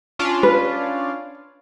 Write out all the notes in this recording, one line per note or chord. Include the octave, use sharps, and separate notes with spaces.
C#4 D4 F4
B4